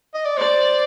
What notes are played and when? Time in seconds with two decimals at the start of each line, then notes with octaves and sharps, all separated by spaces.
0.14 D#5
0.25 D5
0.37 C5 D5